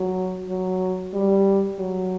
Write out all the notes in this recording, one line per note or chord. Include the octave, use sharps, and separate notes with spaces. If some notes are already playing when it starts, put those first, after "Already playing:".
Already playing: F#3
F#3
G3
F#3